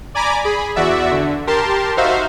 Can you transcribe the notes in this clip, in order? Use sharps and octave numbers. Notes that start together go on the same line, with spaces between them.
D5 G#5 A#5 B5 D6
G#4 B5
E2 F#4 D5 E5
D3
G4 A#4 A5 C6
D#4 F#4 C5 E5 F5